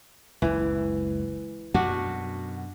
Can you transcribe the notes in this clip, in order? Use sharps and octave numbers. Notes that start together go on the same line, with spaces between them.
F#1 C#2 E3
F#2 B2 D4 F#4